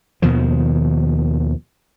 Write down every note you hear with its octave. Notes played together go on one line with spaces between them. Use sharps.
D#2 B2 D#3 F3